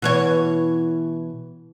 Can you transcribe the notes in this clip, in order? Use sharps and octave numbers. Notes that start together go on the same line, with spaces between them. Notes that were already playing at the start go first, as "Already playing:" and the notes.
B2 E3 C#5